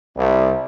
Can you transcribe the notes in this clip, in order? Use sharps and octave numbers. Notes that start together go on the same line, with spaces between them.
C2